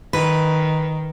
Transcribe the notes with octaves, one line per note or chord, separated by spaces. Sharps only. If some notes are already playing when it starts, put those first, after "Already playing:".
D#3 B4